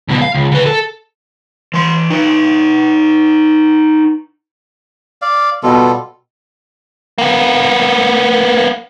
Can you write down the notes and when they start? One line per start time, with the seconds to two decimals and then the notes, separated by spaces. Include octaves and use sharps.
0.08 C#2 B2
0.22 F5
0.34 C#2
0.52 C#3 B4
0.66 A4
1.74 E3 C6
2.10 D#4 B4
5.22 D5 F5
5.63 B2 G3 F4 A4
7.18 A#3 B3